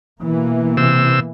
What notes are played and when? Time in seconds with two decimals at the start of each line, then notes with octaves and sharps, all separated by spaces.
0.21 B2 E3 A#3
0.77 C3 E6